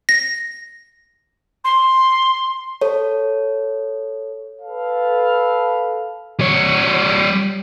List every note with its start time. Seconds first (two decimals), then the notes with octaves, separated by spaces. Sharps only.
0.09 A#6
1.64 C6
2.81 A4 C#5
4.62 A4 B4 F5
6.39 G3 C#5